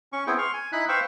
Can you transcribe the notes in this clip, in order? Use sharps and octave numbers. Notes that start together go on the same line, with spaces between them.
C#4 C#6
B3 C4 E4 G#4 G5
C6 C#6 F6
G#5
D#4 E4 B5 F#6
B4 C5 F5 G5 C#6 E6